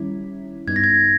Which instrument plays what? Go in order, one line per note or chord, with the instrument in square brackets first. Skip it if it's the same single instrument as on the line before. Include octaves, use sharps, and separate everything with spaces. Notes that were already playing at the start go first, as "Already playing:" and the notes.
Already playing: [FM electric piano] D#3 G3 C#4 E4
[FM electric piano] G2 G3 B3 D#4 [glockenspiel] G#6
[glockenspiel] A#6
G#6